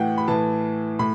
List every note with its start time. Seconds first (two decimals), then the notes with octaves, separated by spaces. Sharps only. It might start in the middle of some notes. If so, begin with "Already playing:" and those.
Already playing: A2 E3 F#5 G5
0.18 B5
0.28 A2 E3 A5
0.99 A2 B5